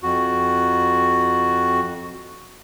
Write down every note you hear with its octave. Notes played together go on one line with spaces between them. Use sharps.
F2 F#4